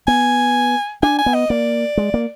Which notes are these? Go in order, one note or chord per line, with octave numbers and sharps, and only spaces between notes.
B3 G#5
D4 G#5
G#5
B3
D#5
A#3 D5
G#3
A#3